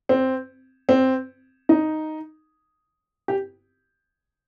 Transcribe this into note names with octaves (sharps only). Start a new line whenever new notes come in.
C4
C4
D#4
G4